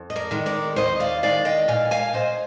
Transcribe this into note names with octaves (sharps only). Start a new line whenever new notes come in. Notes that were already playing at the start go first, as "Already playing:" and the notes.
Already playing: F2
D#5
A#4 D5
D#3 G#3
A#4 D5
D#2 C5 D#5
D5 F5
D#3 G#3 D5 F5
D#5 G5
A#2 F5 G#5
F5 G#5
G#3 C5 D#5